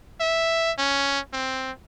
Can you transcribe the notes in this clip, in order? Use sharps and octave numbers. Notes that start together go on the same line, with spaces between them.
E5
C#4
C4